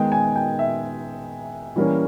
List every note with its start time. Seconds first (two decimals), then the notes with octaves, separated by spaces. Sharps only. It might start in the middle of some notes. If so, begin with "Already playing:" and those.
Already playing: D#3 G#3 B3 D#4 G5
0.12 G#5
0.36 G5
0.59 E5
1.76 E3 G3 A#3 C#4